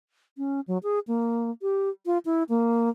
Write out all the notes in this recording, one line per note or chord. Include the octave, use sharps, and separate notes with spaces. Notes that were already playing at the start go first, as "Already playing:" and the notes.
C#4
F#3
G#4
A#3
G4
F4
E4
A#3